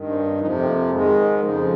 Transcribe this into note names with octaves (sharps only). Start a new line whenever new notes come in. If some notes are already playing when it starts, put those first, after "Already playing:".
Already playing: G2 D#3
C4
C#4
C4
F2 C3 F3 D#4
C4
A#3
G#2 D#3 G#3
F2 C#3 F3